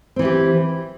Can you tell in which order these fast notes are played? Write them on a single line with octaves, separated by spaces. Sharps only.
C4 E3 E4 G4